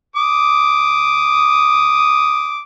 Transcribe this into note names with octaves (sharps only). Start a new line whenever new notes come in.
D6 D#6